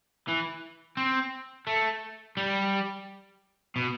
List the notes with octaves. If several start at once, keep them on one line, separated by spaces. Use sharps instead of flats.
E3
C4
A3
G3
B2